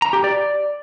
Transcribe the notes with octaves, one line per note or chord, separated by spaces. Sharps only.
A#5
G4
D5